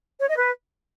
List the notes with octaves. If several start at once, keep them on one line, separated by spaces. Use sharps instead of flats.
C#5
D#5
B4